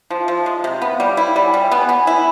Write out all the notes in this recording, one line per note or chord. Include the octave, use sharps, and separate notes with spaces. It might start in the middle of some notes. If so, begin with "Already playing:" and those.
F3
F3 E5
F5
G#3
C3
B3 F5
G3 F5
E4 F5
G3 F#5
G#5
G3 G5
B3
G#5
B3
G#5
E4